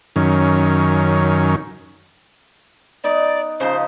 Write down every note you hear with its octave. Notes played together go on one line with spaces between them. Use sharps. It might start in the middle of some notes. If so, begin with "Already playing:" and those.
F#2 D#3 C#4
B3 D#4 D5
C#3 F3 D#4 C5